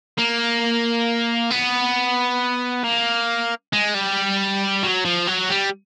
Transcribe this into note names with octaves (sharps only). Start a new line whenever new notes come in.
A#3
B3
A#3
G#3
G3
F#3
F3
F#3
G3